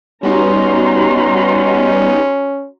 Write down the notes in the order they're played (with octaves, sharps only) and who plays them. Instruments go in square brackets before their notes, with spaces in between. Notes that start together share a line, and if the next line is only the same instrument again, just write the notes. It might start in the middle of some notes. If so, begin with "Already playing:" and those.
[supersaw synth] G3 B3 D#4 [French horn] C#4 [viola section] F#4 A#5 C6